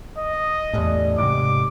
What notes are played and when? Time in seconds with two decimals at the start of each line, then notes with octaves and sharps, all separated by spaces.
0.18 D#5
0.73 E2 A2 D3 G3 C#4
1.18 G#2 C3 D6